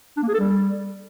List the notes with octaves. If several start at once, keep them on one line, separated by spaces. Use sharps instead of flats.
D4
A#3
G#4
A4
G3